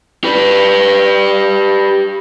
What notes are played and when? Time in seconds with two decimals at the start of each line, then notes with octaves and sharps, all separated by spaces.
0.24 G4 B4